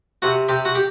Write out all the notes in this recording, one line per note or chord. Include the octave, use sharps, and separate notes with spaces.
C3 F#4
C3 G4
F#4
G4